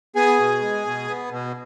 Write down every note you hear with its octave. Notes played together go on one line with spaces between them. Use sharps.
B3 G#4 G#5
B2
G#3
B2
B3
B2